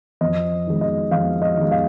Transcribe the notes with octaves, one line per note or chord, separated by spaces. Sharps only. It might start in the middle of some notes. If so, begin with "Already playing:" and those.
F2 D#5
D#3 G#3
D#5
F2 F5
D#5
D#3 G#3
F5